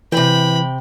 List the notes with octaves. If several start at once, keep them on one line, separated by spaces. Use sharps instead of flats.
C3 E3 G5 B5